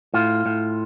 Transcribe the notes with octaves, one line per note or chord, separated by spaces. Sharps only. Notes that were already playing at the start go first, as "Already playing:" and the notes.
A2 F4
A2